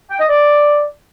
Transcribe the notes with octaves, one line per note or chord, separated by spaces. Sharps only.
G5
D#5
D5